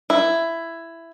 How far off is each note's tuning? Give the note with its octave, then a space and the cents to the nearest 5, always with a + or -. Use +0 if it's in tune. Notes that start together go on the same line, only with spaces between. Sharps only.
E4 +10